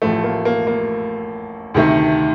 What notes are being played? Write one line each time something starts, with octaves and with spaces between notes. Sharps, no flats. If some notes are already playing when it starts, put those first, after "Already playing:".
A1 A2 F3 A3
A#3
A#3
A#3
D2 C3 D#3 A3